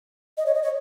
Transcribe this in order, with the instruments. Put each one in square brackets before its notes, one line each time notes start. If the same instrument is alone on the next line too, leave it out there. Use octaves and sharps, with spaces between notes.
[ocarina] D#5
C#5
D#5
C#5